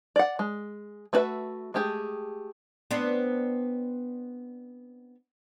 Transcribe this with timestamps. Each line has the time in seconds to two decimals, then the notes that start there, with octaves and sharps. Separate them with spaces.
0.16 D5 F#5
0.39 G#3
1.13 A3 D4 F#4 B4 E5
1.74 G#3 A3 G4 G#4
2.91 B3 C4 D4